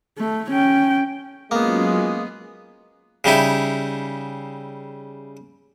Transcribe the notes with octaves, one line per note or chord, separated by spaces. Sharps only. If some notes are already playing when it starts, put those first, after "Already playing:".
A3
C#4 G5
F#3 G#3 A#3 B3 C#4 F4 G#4
C#3 G3 D#4 E4